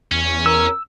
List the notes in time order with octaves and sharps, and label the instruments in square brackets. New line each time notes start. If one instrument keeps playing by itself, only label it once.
[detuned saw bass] E2 [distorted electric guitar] C#4
[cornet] A#4 [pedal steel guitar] E6